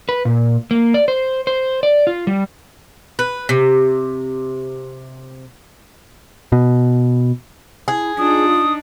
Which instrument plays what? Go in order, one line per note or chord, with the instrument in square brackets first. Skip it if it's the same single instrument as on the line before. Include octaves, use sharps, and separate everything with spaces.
[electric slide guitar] B4
A#2
A#3
D5
C5
C5
D5
F4
G3
[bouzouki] B4
C3
[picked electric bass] B2
[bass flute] E4 [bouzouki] G#4
[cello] D4 D#4 [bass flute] F4 [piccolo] D#6